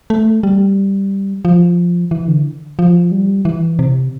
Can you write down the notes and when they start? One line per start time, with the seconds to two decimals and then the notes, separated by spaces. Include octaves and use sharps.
0.10 A3
0.43 G3
1.45 F3
2.11 E3
2.28 D3
2.79 F3
3.12 G3
3.45 E3
3.79 C3